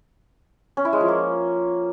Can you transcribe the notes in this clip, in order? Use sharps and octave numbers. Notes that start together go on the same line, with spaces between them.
C#4
E4
G#3
F3
A#3